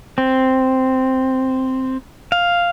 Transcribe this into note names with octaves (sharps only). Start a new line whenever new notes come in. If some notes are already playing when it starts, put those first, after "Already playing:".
C4
F5